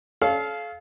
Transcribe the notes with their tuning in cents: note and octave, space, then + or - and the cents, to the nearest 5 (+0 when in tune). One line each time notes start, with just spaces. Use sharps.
A4 -40 C#5 +0 F5 -5